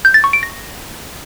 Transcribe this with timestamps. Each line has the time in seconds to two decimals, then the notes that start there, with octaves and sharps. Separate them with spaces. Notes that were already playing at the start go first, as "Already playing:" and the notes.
0.05 G6
0.14 A6
0.24 C#6
0.33 D7
0.43 A#6